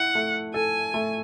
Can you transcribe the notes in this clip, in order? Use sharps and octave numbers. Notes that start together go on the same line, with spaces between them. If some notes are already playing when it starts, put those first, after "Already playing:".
Already playing: E4 F#5
A3
A4 G#5
A3